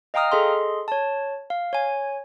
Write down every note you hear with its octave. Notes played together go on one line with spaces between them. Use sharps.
D#5 F5 G5 A#5 D#6 F6
G#4 A4 D#5 C6
C#5 A5
F5
C#5 G#5